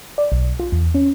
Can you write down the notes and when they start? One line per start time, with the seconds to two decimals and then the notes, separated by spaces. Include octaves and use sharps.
0.18 D5
0.32 B1
0.60 F4
0.72 E2
0.94 C#4